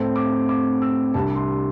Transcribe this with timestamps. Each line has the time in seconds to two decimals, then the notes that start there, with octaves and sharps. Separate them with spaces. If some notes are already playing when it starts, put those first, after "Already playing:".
Already playing: A2 A3 C4
0.16 D6
0.49 D6
0.82 E6
1.14 C2 C3 G3 D4 A5
1.36 C6